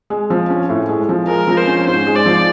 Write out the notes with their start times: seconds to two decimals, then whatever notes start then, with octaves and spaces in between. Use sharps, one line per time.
0.10 G#3
0.30 F3
0.50 C#4
0.69 A2
0.89 G#3
1.09 F3
1.28 G#3 A#4
1.48 F3
1.57 C5
1.67 C#4
1.86 G#2 C5
2.07 G#3
2.16 D5
2.26 F3